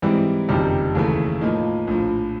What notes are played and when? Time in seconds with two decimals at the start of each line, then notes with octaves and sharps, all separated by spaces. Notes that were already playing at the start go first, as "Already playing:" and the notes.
0.02 G#2 E3 G3 C4 E4
0.49 F#1 F2 C3 D#3 G3
0.95 D#2 C#3 E3 A3
1.41 A2 F3 A#3 D#4
1.87 A#1 A2 F3